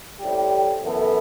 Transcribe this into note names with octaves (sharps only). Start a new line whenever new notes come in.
A2 G3 C4 G4
F#2 E3 B3 E4 A4